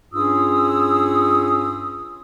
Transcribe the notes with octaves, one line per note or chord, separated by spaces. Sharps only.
G2 C#4 F4 G#4 D#6 E6